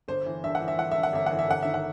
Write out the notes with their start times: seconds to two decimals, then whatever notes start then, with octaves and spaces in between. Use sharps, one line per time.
0.08 G1 C5
0.26 E3
0.43 G2 E5
0.55 F#5
0.60 E3
0.68 E5
0.78 E3 F#5
0.91 G2 E5
1.03 F#5
1.13 G1 E5
1.26 E3 F#5
1.39 E5
1.48 G1 F#5
1.63 D#3 E5
1.74 F#5